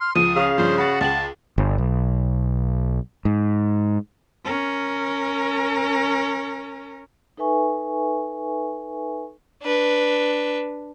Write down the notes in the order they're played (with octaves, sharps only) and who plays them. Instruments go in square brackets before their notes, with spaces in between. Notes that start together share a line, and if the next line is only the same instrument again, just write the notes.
[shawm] C6 [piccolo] F6
[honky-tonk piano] C#2 F3 [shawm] D#6 [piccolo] D#7
[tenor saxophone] C#3 [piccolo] F5
[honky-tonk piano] G2 F3 [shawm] C5
[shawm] F#4 [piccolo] F#5 [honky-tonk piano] B5 A6
[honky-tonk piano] C#2 G5 F#7 [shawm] A5
[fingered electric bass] G1
B1
G#2
[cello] C#4 A#4
[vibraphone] D#4 A4 B4 E5 G#5 C#6
[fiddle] D4 B4